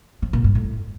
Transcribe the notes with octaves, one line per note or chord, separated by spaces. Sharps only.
F3
A#2
G2
A2